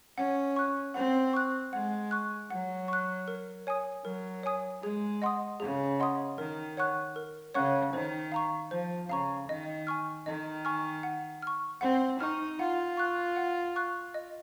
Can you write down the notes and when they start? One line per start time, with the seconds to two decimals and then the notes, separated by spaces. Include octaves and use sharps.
0.18 C#4 F#5
0.56 C#6 F#6
0.94 C4 F#5
1.33 C#6 F#6
1.73 G#3 F#5
2.11 C#6 F#6
2.50 F#3 F#5
2.88 C#6 F#6
3.28 A#4
3.67 C#5 G#5 D#6
4.05 F#3 A#4
4.43 C#5 G#5 D#6
4.82 G#3 G#4
5.22 D#5 F#5 C6 D#6
5.60 C#3 G#4
6.00 D#5 F#5 C6 D#6
6.38 D#3 A#4
6.77 C#5 F#5 C#6 F#6
7.16 A#4
7.54 C#3 C#5 F#5 C#6 F#6
7.93 D#3 C5
8.32 F5 A#5 C#6
8.71 F3 C5
9.09 C#3 F5 A#5 C#6
9.49 D#3 D#5
9.87 G#5 C#6 F6
10.26 D#3 D#5
10.65 G#5 C#6 F6
11.03 F#5
11.42 C#6 F6
11.81 C4 F#5
12.20 D#4 C#6 F6
12.59 F4 F#5
12.97 C#6 F#6
13.36 F#5
13.76 C#6 F#6
14.14 D#5